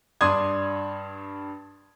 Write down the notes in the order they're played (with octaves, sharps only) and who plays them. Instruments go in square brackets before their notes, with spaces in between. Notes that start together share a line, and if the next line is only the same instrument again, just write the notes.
[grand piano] G2 D4 C6 D#6 G#6